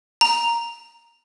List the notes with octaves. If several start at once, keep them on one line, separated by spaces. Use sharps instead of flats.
A#5